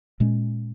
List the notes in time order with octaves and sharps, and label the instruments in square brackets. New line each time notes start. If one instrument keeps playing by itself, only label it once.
[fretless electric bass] A#2 G#3 C#4